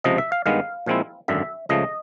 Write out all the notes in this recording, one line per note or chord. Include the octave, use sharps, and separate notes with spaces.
C#2 C3 F3 D#5
E5
F5
G2 D#3 G#3 B3 F5
A#2 F3 G#3 C4 E4
G#1 F#2 D3 E5
C#2 C#3 F3 A3 D#5